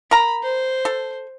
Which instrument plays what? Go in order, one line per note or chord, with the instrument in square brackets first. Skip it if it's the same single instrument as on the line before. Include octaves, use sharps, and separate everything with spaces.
[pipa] A#4 A#5 [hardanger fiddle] B5
[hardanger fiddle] C5
[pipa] A4